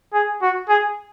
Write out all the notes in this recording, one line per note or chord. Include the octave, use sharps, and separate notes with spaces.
G#4
F#4
G#4